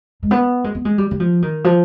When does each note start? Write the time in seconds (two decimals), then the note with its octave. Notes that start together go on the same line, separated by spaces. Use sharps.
0.23 G#3
0.31 B3
0.64 G#3
0.75 B3
0.85 G#3
0.98 G3
1.11 G3
1.20 F3
1.42 D#3
1.64 F3